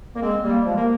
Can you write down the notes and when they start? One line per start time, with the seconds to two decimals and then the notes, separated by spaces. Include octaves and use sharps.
0.15 A#3
0.21 G#3 C4
0.43 G3 A#3
0.64 F3 G#3
0.76 A#3